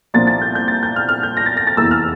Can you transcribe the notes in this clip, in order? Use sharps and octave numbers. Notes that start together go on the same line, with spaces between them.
C2 A#2 F3 A#3 D4 A6
A6
G6
G6
A6
G6
F6
F6
G6
A#6
A6
A#6
A6
F1 E2 E3 A#3 E6
F6